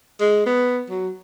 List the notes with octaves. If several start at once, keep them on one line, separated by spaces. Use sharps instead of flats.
G#3
B3
F#3